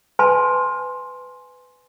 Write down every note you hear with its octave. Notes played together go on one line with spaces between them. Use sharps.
B4 G#5 A5 C6